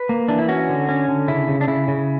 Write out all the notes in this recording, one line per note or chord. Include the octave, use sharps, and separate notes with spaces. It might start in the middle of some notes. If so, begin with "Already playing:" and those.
Already playing: B4
A#3
E3 D4
E4
C#4 F#4
D3
C#4
D3
C#3 E4
C#3
D4
C#3 E4
C#3